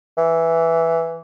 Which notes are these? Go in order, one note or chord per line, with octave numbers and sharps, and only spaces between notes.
E3